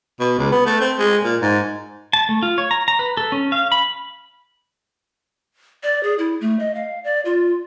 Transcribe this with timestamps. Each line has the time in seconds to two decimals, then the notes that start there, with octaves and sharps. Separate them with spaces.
0.20 B2
0.38 C#2
0.52 B3
0.66 A3
0.80 C4
0.99 G#3
1.24 A#2
1.42 G#2
2.13 A5
2.29 A3
2.42 F4
2.58 C#5
2.71 A#5
2.88 A#5
2.99 B4
3.17 A4
3.32 C#4
3.52 F5
3.72 B5
5.83 D5
6.03 G#4
6.18 E4
6.41 A3
6.59 D#5
6.75 F5
7.04 D5
7.25 F4